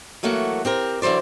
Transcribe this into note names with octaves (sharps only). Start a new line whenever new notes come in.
E3 F#3 A3 A#3 F#4
C4 G4 A#4
D3 E3 F#3 C5 D5